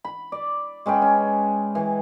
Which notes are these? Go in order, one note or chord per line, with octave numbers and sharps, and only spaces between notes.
B5
D5
G#3 C#4 B4 G5
C#4
E3